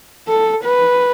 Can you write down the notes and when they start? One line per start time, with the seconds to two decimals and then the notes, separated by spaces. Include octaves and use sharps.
0.28 A4
0.65 B4